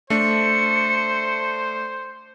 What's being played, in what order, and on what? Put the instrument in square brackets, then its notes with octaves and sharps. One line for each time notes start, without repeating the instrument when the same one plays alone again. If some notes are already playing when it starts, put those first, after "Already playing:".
[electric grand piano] A3 D4 [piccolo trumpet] C5 [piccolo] C#7